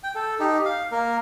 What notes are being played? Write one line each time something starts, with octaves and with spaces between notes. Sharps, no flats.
G5
A4
D#4 G4
F5
A#3 A#4